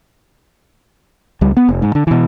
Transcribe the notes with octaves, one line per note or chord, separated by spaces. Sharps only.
C#2 G3
B3
F1
G#2
D3
B2 E3